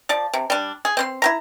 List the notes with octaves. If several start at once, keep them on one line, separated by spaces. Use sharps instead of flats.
F3 D5 A5
C3
G3 D4
G#4
C4 C5 C6
E4 G4 A#5